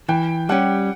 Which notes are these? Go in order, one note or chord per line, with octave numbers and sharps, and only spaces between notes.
E3 G5
G3 C#4 G4 F#5